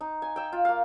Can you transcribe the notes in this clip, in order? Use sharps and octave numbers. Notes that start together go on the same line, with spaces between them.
D#4
G#5
G5 E6
F4
A#3 F5